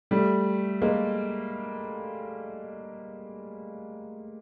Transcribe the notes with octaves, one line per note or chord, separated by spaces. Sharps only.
G3 A3
G#3 A#3